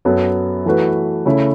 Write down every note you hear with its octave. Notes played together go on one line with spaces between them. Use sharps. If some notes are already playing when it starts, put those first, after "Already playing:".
F#2 F#3 B3 A4
E3 A3 F#4 B4
C#3 A3 C#4 E4 A4